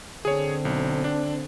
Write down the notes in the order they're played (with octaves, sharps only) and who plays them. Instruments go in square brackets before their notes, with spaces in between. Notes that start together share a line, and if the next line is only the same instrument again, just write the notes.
[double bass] D3 C4 [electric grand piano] G#4 C#5
[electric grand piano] B1
D4